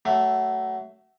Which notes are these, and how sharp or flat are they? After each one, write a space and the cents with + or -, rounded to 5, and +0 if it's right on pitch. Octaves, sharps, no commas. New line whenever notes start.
F#3 +25 A3 +0